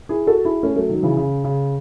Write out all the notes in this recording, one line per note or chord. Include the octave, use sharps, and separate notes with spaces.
E4 G#4
F#4 A4
E4 G#4
A3 C#4
F#3 A3
D#3 F#3
C#3 E3
C#3
C#3